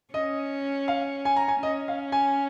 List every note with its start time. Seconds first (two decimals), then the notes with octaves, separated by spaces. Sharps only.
0.14 C#4 D#5
0.88 F5
1.25 G#5
1.36 A#5
1.48 G#5
1.63 C#4 D#5
1.88 F5
2.12 G#5